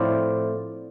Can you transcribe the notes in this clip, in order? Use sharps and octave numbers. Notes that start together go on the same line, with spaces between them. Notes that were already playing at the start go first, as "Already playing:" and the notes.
Already playing: A2 F3 C4 E4 D5